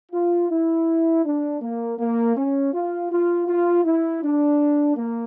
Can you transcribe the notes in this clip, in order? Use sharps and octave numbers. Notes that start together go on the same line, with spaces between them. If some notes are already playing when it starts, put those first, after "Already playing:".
F4
E4
D4
A#3
A#3
C#4
F4
F4
F4
E4
D4
A#3